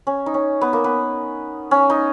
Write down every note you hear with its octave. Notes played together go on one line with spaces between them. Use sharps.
C#4
D#4
C#4
B3
A#3
B3
C#4
D#4